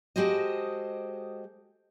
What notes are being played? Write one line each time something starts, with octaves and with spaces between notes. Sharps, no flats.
G#3 F#4 G4 A4 C5 D#5